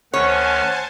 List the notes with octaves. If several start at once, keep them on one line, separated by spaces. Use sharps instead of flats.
D2 D#3 C#4 C5 C#5 F#5 G#5 A5